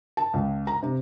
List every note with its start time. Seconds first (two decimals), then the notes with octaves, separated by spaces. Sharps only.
0.17 A5
0.33 C#2
0.67 A#5
0.83 C3